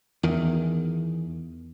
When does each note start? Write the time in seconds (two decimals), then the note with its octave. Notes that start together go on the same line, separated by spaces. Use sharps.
0.23 E2 D#3